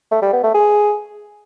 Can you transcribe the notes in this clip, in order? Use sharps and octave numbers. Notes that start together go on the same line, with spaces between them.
A3
G3
B3
A3
G#4